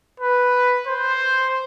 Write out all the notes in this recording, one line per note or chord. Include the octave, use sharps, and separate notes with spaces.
B4
C5